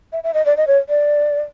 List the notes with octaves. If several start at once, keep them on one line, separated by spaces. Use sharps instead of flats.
E5
E5
D#5
D5
D#5
C#5
D5